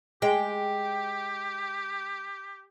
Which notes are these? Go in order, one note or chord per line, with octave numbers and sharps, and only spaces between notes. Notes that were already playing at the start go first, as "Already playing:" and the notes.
G#3 G4 G5